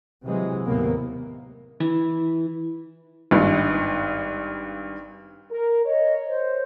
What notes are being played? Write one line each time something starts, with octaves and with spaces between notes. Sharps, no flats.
C3 E3 F#3 G#3
D#2 A2 C3 F#3 A#3 B3
E3
G#1 G2
A#4
C#5 D#5
C5